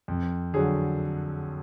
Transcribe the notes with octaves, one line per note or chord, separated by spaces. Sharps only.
F2
D3 F#3 G#4